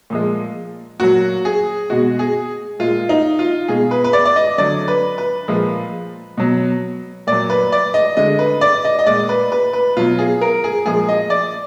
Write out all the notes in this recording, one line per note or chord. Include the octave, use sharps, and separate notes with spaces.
A#2 F3 G#3
A#2 F#3 F#4
G#4
B2 G#3 F#4
G#4
A#2 G#3 F4
D#4
F4
B2 G#3 G#4
B4
B4
D5
D5
D#5
D3 F#3 D5
B4
B4
A#2 F3 G#3
B2 F#3
A#2 F#3 D5
B4
D5
D#5
D3 G#3 D#5
B4
D5
D#5
D#5
A#2 G#3 D5
B4
B4
B4
B2 F#3 F4
G#4
A#4
G#4
A#2 F3 G#3 G#4
D#5
D5